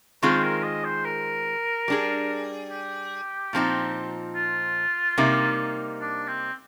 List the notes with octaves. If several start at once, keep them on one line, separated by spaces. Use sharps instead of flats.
D#3 G#3 C4 F4 G#4 C5
A#4
D#5
C5
A#4
G3 D4 G#4
G4
A#2 F3 C4 D#4
F4
C3 G3 A#3 D#4
D4
C4